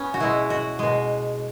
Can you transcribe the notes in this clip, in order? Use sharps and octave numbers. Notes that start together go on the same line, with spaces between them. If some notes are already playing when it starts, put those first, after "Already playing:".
Already playing: B3 C#4
F#4
B2 G#3 E4
F#4
B2 G#3